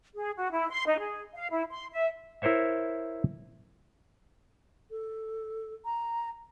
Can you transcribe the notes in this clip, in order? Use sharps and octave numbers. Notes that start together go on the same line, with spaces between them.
G#4
F#4
E4
C6
D#4
G#4
F5
E4
C6
E5
E4 A#4 C5 C#5 E5
A4
A#5